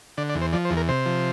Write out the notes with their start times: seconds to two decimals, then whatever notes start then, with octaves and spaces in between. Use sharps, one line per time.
0.18 D3 D5
0.30 D5
0.35 E2
0.41 C5
0.53 F3 D5
0.65 C5
0.71 E2
0.77 A#4
0.89 C3 C5
1.06 F3